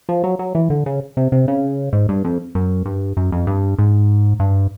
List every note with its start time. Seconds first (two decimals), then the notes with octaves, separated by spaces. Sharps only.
0.09 F3
0.24 F#3
0.39 F#3
0.55 E3
0.70 D3
0.86 C#3
1.17 C3
1.32 C3
1.48 C#3
1.93 G#2
2.09 G2
2.24 F2
2.55 F#2
2.85 G2
3.17 F#2
3.32 F2
3.47 G2
3.78 G#2
4.40 G2